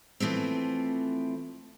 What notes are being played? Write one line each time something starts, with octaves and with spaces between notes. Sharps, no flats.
E3 F3 A3 C4